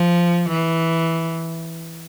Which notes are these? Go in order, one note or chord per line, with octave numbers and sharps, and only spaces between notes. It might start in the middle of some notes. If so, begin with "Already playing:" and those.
Already playing: F3
E3